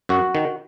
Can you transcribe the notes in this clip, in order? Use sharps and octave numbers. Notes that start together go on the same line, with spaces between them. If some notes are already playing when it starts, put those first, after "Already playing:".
F#2 F#4
D#3